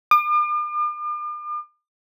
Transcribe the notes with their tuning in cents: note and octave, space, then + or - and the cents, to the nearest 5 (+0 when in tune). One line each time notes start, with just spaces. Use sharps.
D6 +45